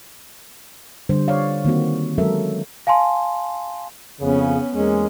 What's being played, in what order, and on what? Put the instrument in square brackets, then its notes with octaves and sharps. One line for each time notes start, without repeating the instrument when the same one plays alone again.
[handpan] D3 G3 C5
C#5 D5 F5
D#3 A#3 C4 F#4
F#3 G#3 C#4 A4 A#4 E5
[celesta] F5 G#5 A5 C6
[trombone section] F2 C#3 [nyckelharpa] B3 C#4
[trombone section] E2 G#3 [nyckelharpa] A#3 C#4